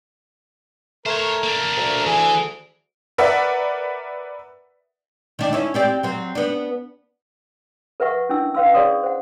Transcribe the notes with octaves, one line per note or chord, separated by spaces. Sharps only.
A3 A#4 C5 C#5
A#3 D4
D2
E3 G#4
A#4 B4 D5 E5 F#5
D#3 D4
C#4 E4
C4 G4 D5
F#3 C4
B3 D4
A#4 B4 E5 F#5 C#6
C#4 D4 E4 E6
C#4 B4 F5 C6 E6
G#4 C#5 D5 C6 D#6
C5 F#5